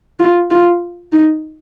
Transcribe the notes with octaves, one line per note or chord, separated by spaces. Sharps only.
F4
F4
D#4